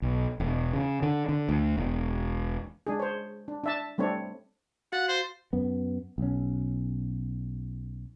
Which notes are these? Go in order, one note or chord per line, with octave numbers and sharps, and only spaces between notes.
B1
E1
C#3
D3
D3
D2
E1
G#3 D4 G#4
C5 C#5
D4
D4 E5 A5
G3 A3 C4 D4 C#5
F#4 F5 F#5 A6
C5
F#2 B3
B1 C#4